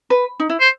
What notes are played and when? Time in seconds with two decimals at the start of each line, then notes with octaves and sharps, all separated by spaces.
0.10 B4
0.40 D#4
0.49 E4
0.61 C5